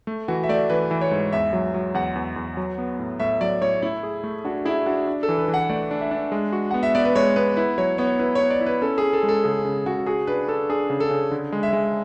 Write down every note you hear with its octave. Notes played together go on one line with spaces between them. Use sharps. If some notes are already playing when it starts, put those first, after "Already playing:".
A3
E3 F#4
E5
A3 D5
E3 B4
E3
C#5
G#2
E2 E5
F#3
F#3
E2 F#5
E2
E2
F#3
B3
A2
A2 E5
F#3 D5
A2 C#5
A3 E4
G#4
A3
D4 F#4
E4 G#4
D4 F#4
D4
A4
E3
B4
E3
F#5
A3 D5
D4
E5
D4
G#3
F#4
B3 F#5
E5
B3 D5
B4
G#3 C#5
B3 B4
E4 B4
F#3 C#5
B3 C#5
E4 B4
C#5
B3
D5
E4
B4
C#4 A4
C#4 G#4
A4
G#3
A4
C#3 G#4
C#3
C#3 F#4
F#4 G#4
D4 B4
D4 A4
D4 G#4
C#3
A4
C#3
D3
G#3
E5
G#3